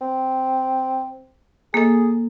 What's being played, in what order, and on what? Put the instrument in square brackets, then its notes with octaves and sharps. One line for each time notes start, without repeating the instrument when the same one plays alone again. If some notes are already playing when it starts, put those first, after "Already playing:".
[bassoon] C4
[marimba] A#3 A4 [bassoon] G#4